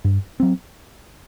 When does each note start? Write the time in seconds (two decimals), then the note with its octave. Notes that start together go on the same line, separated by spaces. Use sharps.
0.05 G2
0.40 F#3 C4